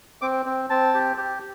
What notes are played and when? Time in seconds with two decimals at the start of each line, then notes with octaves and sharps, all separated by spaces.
0.22 C4 D6
0.46 C4
0.70 C4 A5
0.94 G4
1.18 G4